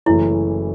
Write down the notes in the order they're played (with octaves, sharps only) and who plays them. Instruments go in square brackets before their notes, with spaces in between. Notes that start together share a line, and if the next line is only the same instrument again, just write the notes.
[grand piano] F#1 F#2 E3 A3 C#4 [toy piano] E4